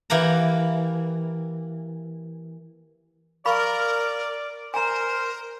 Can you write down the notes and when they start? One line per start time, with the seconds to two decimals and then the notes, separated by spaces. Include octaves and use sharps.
0.10 E3 A#3 G4 F#5 A#5
3.45 A#4 D5 F5 B5 C#6
4.74 A#4 C5 G#5 A#5